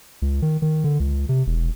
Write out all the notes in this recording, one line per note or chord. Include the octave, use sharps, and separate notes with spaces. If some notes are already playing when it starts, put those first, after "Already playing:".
C#2
D#3
D#3
D3
C#2
C3
E1